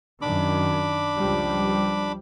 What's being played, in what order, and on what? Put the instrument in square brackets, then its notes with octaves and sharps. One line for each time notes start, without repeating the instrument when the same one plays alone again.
[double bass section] F#2 D#3 [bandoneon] D4 B5 D6
[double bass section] C#2 F3 G3